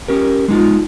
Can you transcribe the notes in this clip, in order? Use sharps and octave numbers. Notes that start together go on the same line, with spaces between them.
C#4 G4 A#4
G#3 D#4 F4